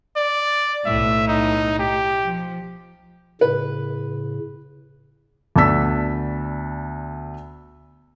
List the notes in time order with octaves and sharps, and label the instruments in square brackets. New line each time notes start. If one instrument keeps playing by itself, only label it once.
[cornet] D5
[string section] B1 A2 [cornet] E5
[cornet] D#4
G4
[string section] F3
[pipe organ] A2 C#3 [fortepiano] B4
[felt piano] D2 B3 D4 A5 E6 B6